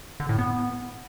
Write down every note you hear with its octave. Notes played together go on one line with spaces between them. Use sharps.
D3
A2
B3